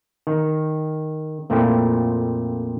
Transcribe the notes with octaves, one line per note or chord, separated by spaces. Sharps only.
D#3
F2 A#2 F3 A3 C4 E4